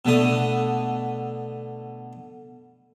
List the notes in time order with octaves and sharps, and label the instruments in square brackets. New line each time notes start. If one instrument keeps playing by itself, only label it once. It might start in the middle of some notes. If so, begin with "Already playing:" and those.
[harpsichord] B2 D3 A3 D#6